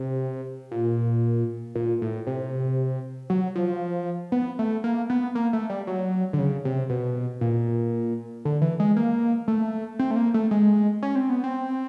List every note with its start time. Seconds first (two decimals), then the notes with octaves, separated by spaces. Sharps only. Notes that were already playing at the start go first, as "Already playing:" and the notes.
Already playing: C3
0.72 A#2
1.75 A#2
2.01 A2
2.27 C3
3.30 F#3
3.55 F3
4.32 B3
4.59 A3
4.84 A#3
5.10 B3
5.35 A#3
5.53 A3
5.70 G3
5.87 F#3
6.33 D3
6.39 C#3
6.65 C3
6.90 B2
7.41 A#2
8.45 D3
8.62 E3
8.80 G#3
8.97 A#3
9.48 A3
9.99 C4
10.11 A3
10.16 A#3
10.34 A3
10.51 G#3
11.03 C#4
11.15 C4
11.30 B3
11.44 C4